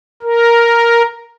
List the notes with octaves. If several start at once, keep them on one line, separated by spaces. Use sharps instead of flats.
A#4